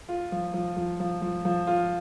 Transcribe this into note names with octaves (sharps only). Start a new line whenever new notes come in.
F4
F3
F3
F3
F3
F3
F3
F4